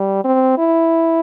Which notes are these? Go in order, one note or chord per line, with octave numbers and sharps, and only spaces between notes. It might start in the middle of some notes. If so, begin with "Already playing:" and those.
Already playing: G3
C4
E4